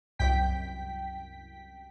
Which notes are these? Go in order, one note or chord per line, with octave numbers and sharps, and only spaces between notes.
C2 F#2 G5 B6